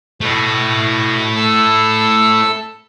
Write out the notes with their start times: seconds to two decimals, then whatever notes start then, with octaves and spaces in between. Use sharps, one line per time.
0.21 B2 A3 E4
1.35 A4 A5 E6